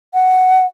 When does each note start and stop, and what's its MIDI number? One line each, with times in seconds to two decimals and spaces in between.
0.14 0.66 78